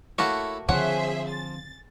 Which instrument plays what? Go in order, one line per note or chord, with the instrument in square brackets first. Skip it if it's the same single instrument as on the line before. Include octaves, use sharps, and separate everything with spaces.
[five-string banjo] A3 A#3 F#4 [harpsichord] E4 A4 C#5
[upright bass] D3 C4 [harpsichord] F3 [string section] G#4 C5 E5 [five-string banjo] C#5 F#5
[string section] A6